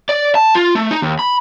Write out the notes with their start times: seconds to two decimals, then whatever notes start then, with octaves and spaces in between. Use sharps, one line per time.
0.09 D5
0.35 A5
0.55 F4
0.75 A3
0.91 D#4
1.02 D#2
1.19 B5